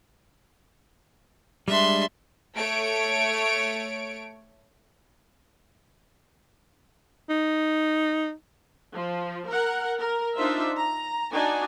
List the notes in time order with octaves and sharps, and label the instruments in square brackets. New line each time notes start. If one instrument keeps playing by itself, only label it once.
[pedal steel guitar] G3 G#3 D4 [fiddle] E5 C6
[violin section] A3 C#5 D7
[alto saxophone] D#4
[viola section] F3
A#4 F#5
A#4
D4 D#4 F4 C5 E5
A#5
D4 D#4 F#4 G#5